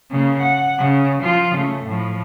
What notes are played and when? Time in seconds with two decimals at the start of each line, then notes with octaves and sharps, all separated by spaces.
0.11 C#3 A#3
0.42 F#5
0.79 C#3
1.23 F3 F4
1.55 C#3 A3
1.85 A2 F3